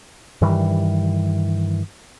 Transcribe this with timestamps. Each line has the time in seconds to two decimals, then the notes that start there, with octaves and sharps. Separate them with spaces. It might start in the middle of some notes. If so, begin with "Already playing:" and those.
0.42 G2 D#3 E3 G3